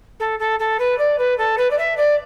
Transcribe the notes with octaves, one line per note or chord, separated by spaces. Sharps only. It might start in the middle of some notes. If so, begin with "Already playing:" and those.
A4
A4
A4
B4
D5
B4
A4
B4
D5
E5
D5